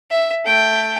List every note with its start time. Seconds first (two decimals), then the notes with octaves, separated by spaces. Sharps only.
0.11 E5
0.45 A3 G5